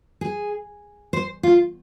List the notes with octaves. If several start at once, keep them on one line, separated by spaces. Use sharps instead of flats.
G#4
C5
F4